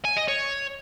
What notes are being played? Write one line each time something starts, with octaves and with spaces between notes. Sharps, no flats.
G#5
D#5
C#5